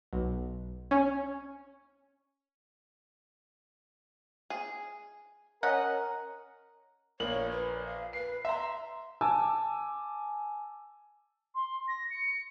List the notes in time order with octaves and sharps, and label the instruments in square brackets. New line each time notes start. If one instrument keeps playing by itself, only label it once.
[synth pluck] B1
C#4
[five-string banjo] G#4
[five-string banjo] C#4 D#5 F#5 [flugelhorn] A#4
[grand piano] A#1 A#3 F#7 [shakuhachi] C#5
[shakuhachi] B4
F5
[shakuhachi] B4 [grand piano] C7
[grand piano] E5 A#5 [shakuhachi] C6
[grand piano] G#5 A5 D6 E6
[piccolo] C6
A#6
C#7